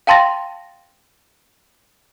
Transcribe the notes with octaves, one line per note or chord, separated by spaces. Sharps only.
F5 G5 A5 C6 A6 A#6